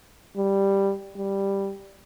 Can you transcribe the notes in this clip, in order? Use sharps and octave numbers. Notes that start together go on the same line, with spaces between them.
G3
G3